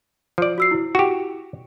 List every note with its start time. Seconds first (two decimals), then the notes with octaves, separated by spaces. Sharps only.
0.38 F3 D5
0.58 F#4 E6 C7
0.71 E4
0.95 F#4 G4